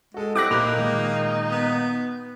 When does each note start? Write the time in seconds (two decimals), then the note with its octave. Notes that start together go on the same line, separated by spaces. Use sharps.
0.14 G#3 F#4 A4
0.36 G3 C4 E4 D6 F#6 A#6
0.51 A#2 A#3 D#4 B5 F7
0.76 A#2 D#3 G#3
1.51 B3